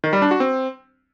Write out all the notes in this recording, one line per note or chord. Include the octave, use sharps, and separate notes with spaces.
D#3
G3
D4
F#4
C4